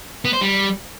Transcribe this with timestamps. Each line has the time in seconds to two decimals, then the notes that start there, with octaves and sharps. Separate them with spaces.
0.25 B3
0.33 C5
0.41 G3